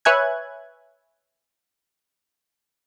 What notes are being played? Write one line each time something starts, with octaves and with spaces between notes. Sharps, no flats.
B4 C#5 E5 G#5 F#6 G#6